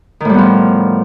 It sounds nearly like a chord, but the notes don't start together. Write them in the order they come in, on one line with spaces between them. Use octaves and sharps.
D#3 A2 G3 B3 F3